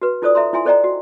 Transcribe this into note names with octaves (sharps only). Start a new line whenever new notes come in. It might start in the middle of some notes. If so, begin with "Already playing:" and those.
F#4 B4
D#4 F4 A4 C5 D5 D#6
A4 E5 A#5 C6
E4 F4 E5 G#5 C6
A4 C5 D5 D#5 G5 A#5
F#4